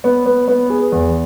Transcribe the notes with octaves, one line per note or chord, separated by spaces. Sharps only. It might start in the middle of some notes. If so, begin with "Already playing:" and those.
B3
B3
B3
G#4
E2